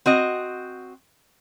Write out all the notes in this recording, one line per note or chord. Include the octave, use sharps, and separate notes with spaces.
C4 F#4 D#5